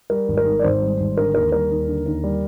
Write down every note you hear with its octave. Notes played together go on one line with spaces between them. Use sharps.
G3 A#4
G#1
A#4
G#2
D5
G#1 C5
G3
G#1
D3 A#4
D#2 A#4
G3 A#4
D#2
D3
D#2
G3